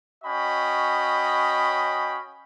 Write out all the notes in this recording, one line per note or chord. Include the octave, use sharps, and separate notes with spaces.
C#4 F#4 D#5 G5 B5